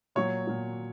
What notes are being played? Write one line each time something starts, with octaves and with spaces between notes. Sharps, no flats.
A#2 F#3 C#5
A#2 F#3